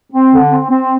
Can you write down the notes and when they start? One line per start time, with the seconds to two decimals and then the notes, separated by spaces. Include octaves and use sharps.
0.12 C4
0.32 D3
0.50 C4
0.70 C4